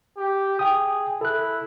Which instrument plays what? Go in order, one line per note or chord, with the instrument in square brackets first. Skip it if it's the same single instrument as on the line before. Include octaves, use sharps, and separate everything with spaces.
[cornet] G4
[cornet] G#4 [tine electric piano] G5 D#6
[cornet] E4 [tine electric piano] A4 F#6